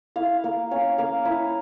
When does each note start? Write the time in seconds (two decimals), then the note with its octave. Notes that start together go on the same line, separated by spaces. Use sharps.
0.16 E4 F5
0.44 A#3 F5
0.71 C#4 F5
0.98 A#3 F5
1.25 E4